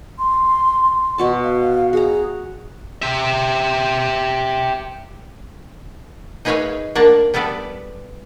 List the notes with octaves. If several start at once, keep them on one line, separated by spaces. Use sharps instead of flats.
C6
B2 F#4 A5
F5
F#4 G#4 A#5
G4 E5
D#4 G#4 B4 C#5 E5 F5
A#3 D4 F#5
G3 B3 A4 B4 D5